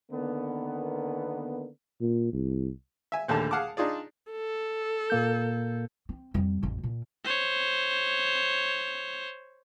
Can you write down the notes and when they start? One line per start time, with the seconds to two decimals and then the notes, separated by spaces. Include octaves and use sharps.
0.11 D3 D#3 A#3 B3
2.01 A#2
2.33 C2
3.12 E5 G#5
3.28 A#1 D#2 D3 A3 A5
3.51 G#4 F5 F#5 A5 D6
3.77 D4 D#4 F4 G#4 D5
4.31 A4
5.10 A#2 A#3 G6
6.09 C4
6.34 F2 G3
6.63 A1 F2
6.83 A#2
7.24 C5 C#5